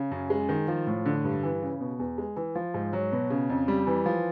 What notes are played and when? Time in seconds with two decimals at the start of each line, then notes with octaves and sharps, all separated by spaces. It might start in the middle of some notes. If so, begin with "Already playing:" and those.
Already playing: C#3
0.11 F#2
0.30 G#3
0.49 D#3
0.68 F3
0.87 A2
1.06 D3
1.24 G2
1.43 E3
1.62 C#3
1.80 B2
1.99 E2
2.18 G#3
2.36 E3
2.55 F3
2.74 G#2
2.93 F#3
3.12 B2
3.30 C#3
3.49 F2
3.68 G3
3.87 E3
4.06 F3